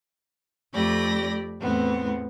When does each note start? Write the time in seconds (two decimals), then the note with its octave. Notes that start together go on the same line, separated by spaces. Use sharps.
0.74 F2 A3 G4 D5 B5 A#6
1.60 E2 A2 B3 C4